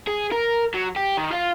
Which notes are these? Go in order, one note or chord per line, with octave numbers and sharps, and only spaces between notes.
G#4
A#4
F#3
G4
D#3
F4 F5